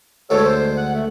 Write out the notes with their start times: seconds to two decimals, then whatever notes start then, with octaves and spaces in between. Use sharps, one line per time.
0.30 D2 D3 G#3 A4 C#5
0.45 C5
0.77 F#5
0.94 A3